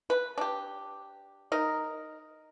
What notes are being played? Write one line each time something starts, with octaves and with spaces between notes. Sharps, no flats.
B4
D4 G4
D#4 A#4